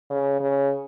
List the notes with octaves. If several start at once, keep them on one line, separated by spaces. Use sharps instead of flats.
C#3
C#3